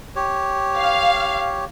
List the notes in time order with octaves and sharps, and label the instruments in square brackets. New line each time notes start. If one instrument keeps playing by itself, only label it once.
[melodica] G4 C#5
[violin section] F5